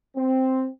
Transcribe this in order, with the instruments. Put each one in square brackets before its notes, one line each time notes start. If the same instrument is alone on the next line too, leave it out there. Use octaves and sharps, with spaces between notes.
[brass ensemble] C4